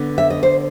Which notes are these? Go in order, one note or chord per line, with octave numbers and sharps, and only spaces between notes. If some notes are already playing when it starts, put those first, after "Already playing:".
Already playing: D3 B3
E5
D#5
C5